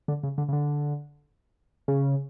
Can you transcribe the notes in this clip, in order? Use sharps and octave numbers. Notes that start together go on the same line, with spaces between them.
D3
C#3
D3
C#3
D3
C#3